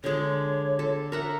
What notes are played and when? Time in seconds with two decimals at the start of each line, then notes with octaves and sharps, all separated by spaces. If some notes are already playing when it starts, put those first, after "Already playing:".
0.04 D3 G#3 C#5
0.79 A4
1.12 A#4 E5 F#5